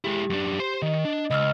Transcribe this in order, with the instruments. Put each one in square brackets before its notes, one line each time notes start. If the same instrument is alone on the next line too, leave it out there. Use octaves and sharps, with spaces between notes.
[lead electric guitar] G#3 E4 [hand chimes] G4
[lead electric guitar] F#2 D4
C5 C6
[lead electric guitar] D#3 [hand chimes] D#5
[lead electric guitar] D4
[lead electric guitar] C#2 [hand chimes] D#5 E6 F6